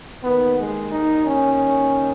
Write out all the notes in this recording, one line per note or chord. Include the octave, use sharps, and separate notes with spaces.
D#2 D#3 B3
G#3
D#4
C#4